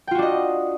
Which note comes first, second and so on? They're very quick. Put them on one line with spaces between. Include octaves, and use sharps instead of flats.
G5 F4 F#4 D4 D#5